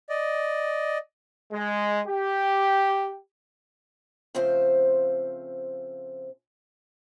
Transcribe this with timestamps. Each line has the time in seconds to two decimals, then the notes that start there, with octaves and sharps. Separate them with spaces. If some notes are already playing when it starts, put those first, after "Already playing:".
0.09 D5 D#5
1.52 G#3
2.07 G4
4.35 C#3 F3 A3 C4 C5